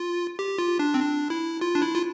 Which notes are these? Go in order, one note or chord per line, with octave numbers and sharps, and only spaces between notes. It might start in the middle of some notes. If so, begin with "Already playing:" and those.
Already playing: F4
G4
F4
D4
C4
D4
E4
F4
D4
E4
F4